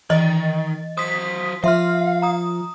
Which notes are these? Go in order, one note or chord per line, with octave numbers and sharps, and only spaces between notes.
D#3 E3 D#5 A6
F#3 C5 D#6 B6
F3 E5 F5 C6 F6
A#5 D#6